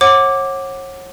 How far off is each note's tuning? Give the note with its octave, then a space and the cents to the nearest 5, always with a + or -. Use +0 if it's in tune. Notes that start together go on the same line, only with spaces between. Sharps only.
C#5 -35 F#5 +0 D6 +0